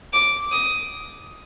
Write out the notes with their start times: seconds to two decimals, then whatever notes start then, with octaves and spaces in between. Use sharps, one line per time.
0.13 D6
0.52 D#6